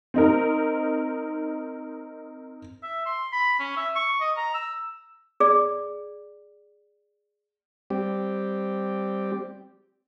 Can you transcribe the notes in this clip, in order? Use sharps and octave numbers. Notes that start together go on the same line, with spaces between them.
C4 D#4 A#4
E5
C6
B5
C#4
E5
C#6
D#5
A#5
E6
G#4 D5
G3 C4 G4